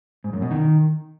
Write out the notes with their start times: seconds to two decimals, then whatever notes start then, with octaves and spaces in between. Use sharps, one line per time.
0.24 G#2
0.33 F#2
0.42 B2
0.51 D#3